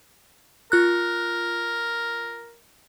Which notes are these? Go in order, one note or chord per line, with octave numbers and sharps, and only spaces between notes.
F4 A#4 F#6